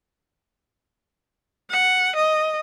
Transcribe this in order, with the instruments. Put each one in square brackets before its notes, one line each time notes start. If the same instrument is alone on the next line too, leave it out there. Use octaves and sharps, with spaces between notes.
[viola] F#5
D#5